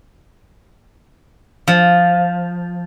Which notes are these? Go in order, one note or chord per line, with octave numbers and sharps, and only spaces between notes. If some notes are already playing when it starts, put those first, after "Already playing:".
F3